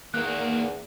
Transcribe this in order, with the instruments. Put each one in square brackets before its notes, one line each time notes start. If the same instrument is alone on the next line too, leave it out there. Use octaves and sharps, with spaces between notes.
[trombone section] E2 [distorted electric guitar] D#3 C4 [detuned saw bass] A#3 [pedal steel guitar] F#6